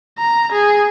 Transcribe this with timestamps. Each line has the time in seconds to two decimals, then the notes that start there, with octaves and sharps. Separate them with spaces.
0.18 A#5
0.52 G#4